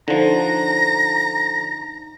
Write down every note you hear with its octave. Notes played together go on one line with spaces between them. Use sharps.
D3 F3 D#4 A#5